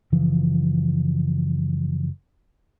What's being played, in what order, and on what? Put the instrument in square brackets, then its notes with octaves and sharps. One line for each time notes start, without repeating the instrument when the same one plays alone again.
[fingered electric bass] F#1 C#3 E3 F3